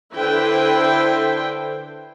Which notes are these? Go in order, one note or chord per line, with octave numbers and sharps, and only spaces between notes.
D3 E4 B4 C5 G5